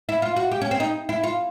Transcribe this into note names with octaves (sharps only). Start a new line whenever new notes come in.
E4
F4
F#4
G4
C#4
C4
D#4
E4
F4